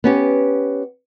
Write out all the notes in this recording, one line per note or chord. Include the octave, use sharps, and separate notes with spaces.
B3 C#4 G4